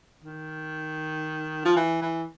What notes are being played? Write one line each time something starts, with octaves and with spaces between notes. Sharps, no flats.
D#3
F3
E3
E3